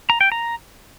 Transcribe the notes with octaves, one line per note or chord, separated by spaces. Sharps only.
A#5
G5
A#5